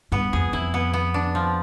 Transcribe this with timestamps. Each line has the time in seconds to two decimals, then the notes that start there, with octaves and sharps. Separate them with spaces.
0.12 G2 B3
0.33 F2 G#4
0.53 F2 E4
0.74 B3
0.94 B3
1.14 D4
1.35 F3